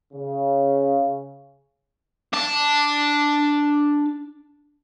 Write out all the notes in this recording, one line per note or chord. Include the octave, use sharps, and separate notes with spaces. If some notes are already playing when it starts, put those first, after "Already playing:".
C#3
D4 A5